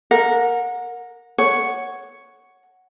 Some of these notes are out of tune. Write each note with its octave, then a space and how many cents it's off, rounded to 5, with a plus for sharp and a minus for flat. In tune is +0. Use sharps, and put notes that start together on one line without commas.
A#4 +0 F#5 -30
C#5 +0 F#5 +0